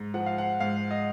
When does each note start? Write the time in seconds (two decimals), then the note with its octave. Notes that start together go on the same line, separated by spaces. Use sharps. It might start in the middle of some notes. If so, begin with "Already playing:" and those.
Already playing: G#2
0.14 F3 F#5
0.26 F5
0.38 F#5
0.60 G#2 F5
0.91 D#5